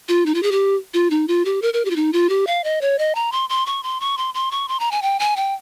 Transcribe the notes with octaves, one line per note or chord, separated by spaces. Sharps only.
F4
D#4
F4
G#4
G4
F4
D#4
F4
G4
A#4
A#4
G4
F4
D#4
F4
G4
F5
D#5
C#5
D#5
A#5
C6
C6
C#6
C6
C#6
C6
C6
C#6
C6
A#5
G#5
G5
G#5
G5